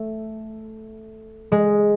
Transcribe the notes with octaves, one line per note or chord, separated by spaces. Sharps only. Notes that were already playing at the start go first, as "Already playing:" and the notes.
Already playing: A3
G#3